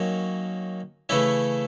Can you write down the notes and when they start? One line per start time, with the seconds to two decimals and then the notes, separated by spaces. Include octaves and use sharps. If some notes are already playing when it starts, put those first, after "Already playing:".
Already playing: D#3 F#3 A#3 C#4
1.09 C#3 E3 A3 C#4 E4